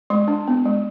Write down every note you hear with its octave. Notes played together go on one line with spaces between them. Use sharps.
G#3 C6
D4
B3
G#3